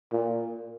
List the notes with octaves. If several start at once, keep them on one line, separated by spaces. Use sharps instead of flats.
A#2